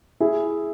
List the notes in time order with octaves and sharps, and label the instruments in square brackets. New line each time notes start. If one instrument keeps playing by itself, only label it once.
[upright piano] E4 G#4